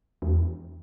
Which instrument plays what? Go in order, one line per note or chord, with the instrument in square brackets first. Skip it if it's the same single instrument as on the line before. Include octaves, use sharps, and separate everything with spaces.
[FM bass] E2